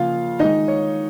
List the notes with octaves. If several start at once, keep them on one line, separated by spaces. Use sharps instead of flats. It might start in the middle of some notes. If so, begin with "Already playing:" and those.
Already playing: C#3 F3 A#3 F4 F5
D#3 G#3 D#4 D#5
C#5